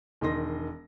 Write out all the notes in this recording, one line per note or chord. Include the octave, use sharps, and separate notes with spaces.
E1 D#3 D#5 C6 A#6